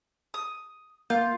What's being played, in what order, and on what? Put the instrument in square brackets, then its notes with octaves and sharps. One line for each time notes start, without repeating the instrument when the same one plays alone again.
[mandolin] D#6
[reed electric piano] A#3 G6 [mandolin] F4